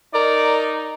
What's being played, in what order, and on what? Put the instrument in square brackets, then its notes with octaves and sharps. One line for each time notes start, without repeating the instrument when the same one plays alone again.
[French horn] D#4 [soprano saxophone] A#4 [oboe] D5